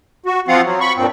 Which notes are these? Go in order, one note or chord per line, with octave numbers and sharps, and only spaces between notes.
F#4
F3 C4 F4 F5 F#5
F#3
B5 C#6
G2 A#2 C4